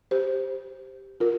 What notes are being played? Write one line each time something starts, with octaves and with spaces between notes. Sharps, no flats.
G4 C5
F4 A#4